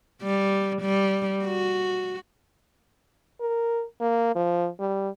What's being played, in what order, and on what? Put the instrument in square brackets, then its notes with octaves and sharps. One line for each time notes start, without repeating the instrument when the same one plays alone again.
[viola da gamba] G3
G3
F#4
[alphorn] A#4
A#3
F3
G3